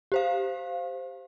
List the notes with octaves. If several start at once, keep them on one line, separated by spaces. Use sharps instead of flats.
G4 C5 F5